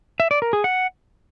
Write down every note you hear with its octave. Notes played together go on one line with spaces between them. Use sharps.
E5
D5
A#4
G#4
F#5